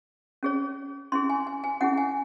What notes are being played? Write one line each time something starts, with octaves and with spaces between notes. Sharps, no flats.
C#4 G#4 C#5
C#4 E4 G#4 C6
G#5
G#5
G#5
C#4 E4 G#4 F#5
G#5